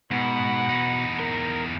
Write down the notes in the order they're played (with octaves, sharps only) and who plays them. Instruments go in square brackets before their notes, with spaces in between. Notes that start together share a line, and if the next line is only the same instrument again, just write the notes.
[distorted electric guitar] G#2 [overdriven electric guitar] B2 [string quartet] F#5 B5
[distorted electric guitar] E2 D#4
[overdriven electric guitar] A#4